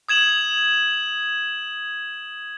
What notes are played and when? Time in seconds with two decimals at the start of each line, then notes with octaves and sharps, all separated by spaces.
0.09 D#6 G#6 E7 F#7